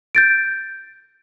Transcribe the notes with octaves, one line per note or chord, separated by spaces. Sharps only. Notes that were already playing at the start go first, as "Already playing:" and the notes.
G6 A6 D7